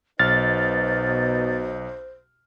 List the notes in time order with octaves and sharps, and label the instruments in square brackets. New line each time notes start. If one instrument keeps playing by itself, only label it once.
[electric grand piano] B1 F6 [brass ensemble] B2 D#4 D#5 [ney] C5 [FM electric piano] A6